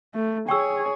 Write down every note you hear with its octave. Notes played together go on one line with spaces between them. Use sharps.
A3
G#4 C#5 G5 C#6 E6